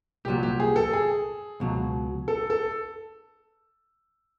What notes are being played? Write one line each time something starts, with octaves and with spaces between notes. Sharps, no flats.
C2 A#2 F#3 G4
G4
G#4
A4
G#4
C#2 B2 F#3
A4
A4